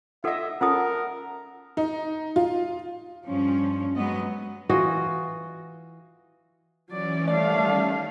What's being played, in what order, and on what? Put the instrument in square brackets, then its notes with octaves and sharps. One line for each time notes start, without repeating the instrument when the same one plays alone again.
[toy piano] D#4 A4 F#5 [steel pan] F4 D#5 [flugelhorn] E5
[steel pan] C#4 A4 [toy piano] F4 A5 D#6 [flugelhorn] A#4 [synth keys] F#5
[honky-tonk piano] D#4
F4
[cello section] G2 F3 C#4
F#3 G#3 B3 C#4 D#5
[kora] E3 F4 F#4 D#5
[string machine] E3 C#4 [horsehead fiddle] F#3 D5
[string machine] D#3 G3 C#4 [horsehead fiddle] A3 F5 [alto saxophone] D5